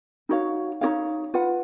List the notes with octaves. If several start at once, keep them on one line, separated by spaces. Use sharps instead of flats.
D#4 F#4 C#5 F5
D#4 F#4 C#5 F5
F4 B4 F#5